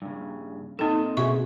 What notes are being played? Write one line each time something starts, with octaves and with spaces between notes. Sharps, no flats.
G2 C#3
A#2 C4 D#4 A4 D#5
B2 C#4 F#4 G#4 E5 C#6